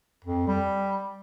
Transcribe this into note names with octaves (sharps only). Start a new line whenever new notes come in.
F2
G3